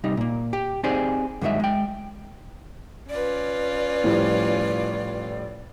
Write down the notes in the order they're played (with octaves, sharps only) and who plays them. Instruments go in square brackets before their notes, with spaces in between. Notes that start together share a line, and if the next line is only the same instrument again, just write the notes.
[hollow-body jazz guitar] C3 G3 D#4
A#2 A#3
G4
C4 D#4 G4 G#4 C5 D5
G2 D3 D#3 F#3 G#3 E5
G#3 G5
[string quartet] C#4 F4 B4 [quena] D5
[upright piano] A2 F3 G3